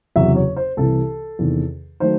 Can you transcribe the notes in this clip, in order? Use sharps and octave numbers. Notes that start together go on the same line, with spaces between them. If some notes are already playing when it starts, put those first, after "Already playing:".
F#1 E2 C3 F#3 E5
C#5
C5
C2 C3 E3 A4
E2 C3 D#3
D#3 F#3 A3 C5